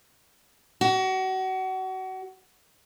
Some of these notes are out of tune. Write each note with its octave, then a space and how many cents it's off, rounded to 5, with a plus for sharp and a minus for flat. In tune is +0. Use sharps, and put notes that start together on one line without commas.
F#4 +30